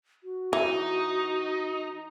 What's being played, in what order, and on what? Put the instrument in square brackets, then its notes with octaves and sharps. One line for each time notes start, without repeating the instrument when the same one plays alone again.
[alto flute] F#4
[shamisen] E3 [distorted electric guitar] D#4